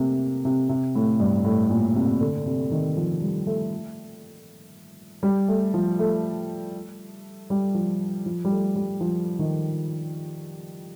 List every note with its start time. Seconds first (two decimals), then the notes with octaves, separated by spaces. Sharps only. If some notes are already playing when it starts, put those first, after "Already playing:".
Already playing: C3 A3 A#3
0.45 C3
0.69 C3
0.95 A2
1.20 G2
1.44 A2
1.70 A#2
1.95 C3
2.20 D3
2.46 C3
2.71 D#3
2.97 F3
3.22 G3
3.47 A3
5.23 G3
5.48 A3
5.74 F3
5.99 A3
7.50 G3
7.75 F3
8.26 F3
8.45 G3
8.51 A3
8.75 G3
9.01 F3
9.39 D#3